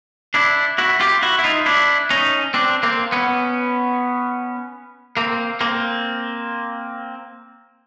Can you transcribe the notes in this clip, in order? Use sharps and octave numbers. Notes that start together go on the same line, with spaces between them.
D4 E4
E4 F#4
F4 G4
E4 F#4
E4
D#4 F4
D4 E4
C#4 D#4
C4 D4
A#3 C4
B3 C#4
A#3 C4
A#3 C4